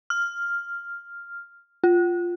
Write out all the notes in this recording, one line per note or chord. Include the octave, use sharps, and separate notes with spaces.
F6
F4